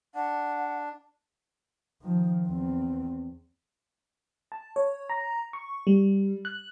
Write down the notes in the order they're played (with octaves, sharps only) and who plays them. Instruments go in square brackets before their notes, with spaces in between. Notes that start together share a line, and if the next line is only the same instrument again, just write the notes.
[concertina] D4 [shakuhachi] F#5
[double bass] D#3 F3
E2 C4
[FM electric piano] A5
C#5
A#5
C#6
G3
F#6